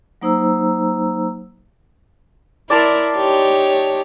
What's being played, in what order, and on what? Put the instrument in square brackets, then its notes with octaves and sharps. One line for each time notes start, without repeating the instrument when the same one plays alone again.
[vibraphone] F#3 A#3 D#4 C5 A#5 E6
[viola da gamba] E4 A#4 [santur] D5 A5 C6
[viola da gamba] D#4 G4 C#5